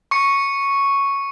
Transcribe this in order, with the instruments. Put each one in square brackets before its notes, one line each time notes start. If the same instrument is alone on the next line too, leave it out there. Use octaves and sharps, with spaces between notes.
[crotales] C#6 C#7